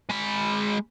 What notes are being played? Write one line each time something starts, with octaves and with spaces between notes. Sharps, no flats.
G#3 B5